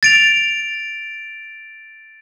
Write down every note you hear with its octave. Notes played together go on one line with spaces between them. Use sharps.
A6 D7 F7